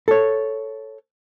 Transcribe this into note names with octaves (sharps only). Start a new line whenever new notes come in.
A4 C#5